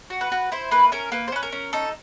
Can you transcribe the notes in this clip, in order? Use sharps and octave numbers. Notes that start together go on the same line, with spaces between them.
F#4
B4
F#4
E4 C5
A#3 B4
C#4 A#4
A#3 B4
C5
C#4 B4
A#4
C#4
D#4 A4